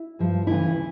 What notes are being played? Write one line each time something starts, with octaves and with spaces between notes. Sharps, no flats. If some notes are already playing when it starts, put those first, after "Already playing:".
Already playing: E4
G2 F3
D2 C#3 E3 E4